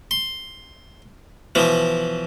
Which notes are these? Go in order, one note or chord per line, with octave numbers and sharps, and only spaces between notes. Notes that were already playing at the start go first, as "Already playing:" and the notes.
C6
B2 E3 F3